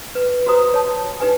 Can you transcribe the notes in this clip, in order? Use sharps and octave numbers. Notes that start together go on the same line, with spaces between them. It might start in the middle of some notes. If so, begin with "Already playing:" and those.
B4
F#4 G4 B4 C5 A#5 D#6
C#5 A5
D#4 G4 B4 G#5